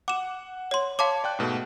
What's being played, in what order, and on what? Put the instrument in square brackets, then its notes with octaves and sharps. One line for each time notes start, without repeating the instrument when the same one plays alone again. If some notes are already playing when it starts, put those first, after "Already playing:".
[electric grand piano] F#5 [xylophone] D6 E7
[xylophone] C#5 C6
[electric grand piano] C#5 C6 [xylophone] F5 A5 D6
[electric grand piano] D5 G5 F#6
G#2 B2 A3